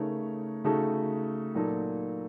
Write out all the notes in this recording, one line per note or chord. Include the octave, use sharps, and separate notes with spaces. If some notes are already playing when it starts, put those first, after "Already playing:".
Already playing: C#3 A3 D#4 A#4 C#5
C#3 A3 D#4 F#4 A4
A#2 F#3 A#3 D#4 A4